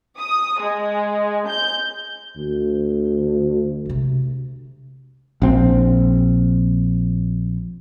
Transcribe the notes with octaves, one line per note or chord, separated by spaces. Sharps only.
D#6
G#3
G6
D2
C3 A3
A#1 C4